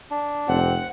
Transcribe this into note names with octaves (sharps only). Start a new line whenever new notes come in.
D4
F1 C4 F#5